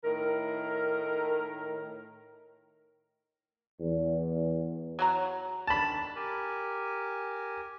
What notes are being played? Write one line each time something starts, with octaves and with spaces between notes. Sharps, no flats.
A2 D#3 A#4
E2
F#3 F#4 A#5
D#3 D4 A5 B5
G4 A#4 G#5